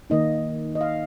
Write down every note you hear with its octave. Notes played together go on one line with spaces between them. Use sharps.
D#3 A#3 D#4 D#5
D#5
F5